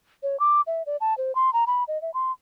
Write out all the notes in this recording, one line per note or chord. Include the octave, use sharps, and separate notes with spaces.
C#5
D6
E5
D5
A5
C5
C6
A#5
B5
D#5
E5
C6